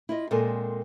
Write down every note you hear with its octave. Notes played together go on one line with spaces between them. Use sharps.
E4 F4 D#5
A#2 G#3 C4 A4 A#4 G#5